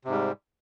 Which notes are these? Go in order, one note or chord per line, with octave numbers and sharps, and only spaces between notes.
G#2 C3 G3